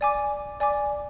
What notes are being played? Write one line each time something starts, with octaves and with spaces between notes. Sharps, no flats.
D5 G#5 D6
D5 G#5 D6